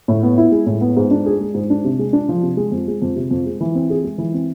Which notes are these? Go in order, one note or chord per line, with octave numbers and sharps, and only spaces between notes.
A2
B3
E4
G#3
A2
B3
G#2
D4
G#4
G#3
G#2
D4
C3
G#3
D4
F3
C3
G#3
F2
G#3
F2
C3
F2
G#3
E3
C4
G#4
G#3
E3
C4